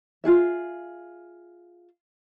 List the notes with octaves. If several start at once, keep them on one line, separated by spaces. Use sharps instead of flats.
F4 F#4 G#4 E5